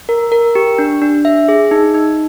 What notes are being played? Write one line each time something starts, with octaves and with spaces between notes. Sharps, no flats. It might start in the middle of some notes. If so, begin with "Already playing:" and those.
A#4
A#4
G4
D4
D4
E5
G#4
D#4
D#4